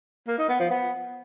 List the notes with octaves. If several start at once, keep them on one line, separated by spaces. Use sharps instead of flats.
A#3
D#4
B3
F3
B3